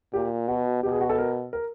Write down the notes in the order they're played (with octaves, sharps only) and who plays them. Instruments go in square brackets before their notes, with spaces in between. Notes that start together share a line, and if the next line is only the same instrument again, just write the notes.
[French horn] A#2 [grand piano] G4
[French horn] B2 [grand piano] F#4
[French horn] B2 [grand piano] G4
[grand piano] G#4
F#4
A4
A#4
A#4